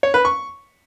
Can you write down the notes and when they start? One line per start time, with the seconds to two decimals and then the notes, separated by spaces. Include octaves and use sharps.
0.03 C#5
0.14 B4
0.25 C#6